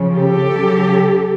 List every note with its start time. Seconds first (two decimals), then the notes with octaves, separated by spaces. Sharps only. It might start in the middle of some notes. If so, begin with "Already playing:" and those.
Already playing: C#3 F3
0.16 G4 A4
0.51 C#3 F#3